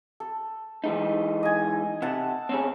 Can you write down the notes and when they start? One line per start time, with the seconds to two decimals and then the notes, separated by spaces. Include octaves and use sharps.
0.20 A4
0.84 E3 G#3 D#4
1.43 D#5 G#5
2.02 C3 A4 F#5 A5
2.49 C4 C#4 G#4